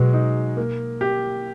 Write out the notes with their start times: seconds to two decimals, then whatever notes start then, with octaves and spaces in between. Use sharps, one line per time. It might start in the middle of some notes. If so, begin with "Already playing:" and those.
Already playing: B2 F#3 G#3
0.14 D#4
0.57 A#3
1.01 G4